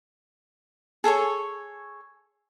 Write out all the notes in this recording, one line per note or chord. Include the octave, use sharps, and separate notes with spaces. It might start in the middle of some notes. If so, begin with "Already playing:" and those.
G#4 A4 C#5 C#6